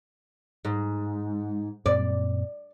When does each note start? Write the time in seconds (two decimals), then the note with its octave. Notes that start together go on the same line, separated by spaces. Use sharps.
0.65 G#2
1.86 F#2 A#2 C4 D5